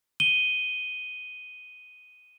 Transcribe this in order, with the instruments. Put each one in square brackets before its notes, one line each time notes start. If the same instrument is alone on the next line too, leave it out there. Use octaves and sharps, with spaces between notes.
[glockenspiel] D#7 G7